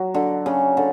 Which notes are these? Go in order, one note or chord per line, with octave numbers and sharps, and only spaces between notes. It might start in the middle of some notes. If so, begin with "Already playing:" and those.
Already playing: F#3
D3
C#3
D3